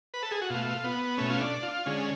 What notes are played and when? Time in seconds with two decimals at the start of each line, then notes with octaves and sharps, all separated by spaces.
0.14 B4
0.23 A4
0.31 G#4
0.42 F#4
0.50 B2 A3 F4
0.84 B3
1.18 B2 A3 C#4
1.30 F4
1.40 D4
1.63 F4
1.86 D3 G#3 C#4